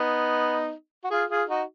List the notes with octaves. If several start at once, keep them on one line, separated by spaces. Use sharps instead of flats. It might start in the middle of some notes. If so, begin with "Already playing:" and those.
Already playing: B3 D#4
F#4
F4 G#4
F4 G#4
D#4 F#4